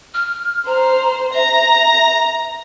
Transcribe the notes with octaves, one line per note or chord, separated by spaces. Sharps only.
F6
C5 A#5
E5 A#5